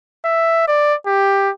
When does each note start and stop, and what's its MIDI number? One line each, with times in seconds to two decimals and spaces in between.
0.25 0.67 76
0.68 0.94 74
1.07 1.51 67